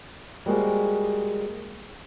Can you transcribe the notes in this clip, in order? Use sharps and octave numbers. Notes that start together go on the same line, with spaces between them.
G3 G#3 A#3 F#4 G#4 C5